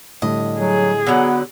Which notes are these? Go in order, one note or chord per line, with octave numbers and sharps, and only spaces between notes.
A2 D3 G3 D#5
F#3 G#4
D3 F#3 B3